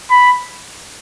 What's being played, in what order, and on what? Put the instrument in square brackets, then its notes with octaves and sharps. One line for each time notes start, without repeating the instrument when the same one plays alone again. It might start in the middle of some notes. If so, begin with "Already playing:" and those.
[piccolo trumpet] B5